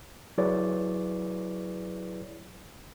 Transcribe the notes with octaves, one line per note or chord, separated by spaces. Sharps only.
F#3 E4 G#4 B4 C#5 D5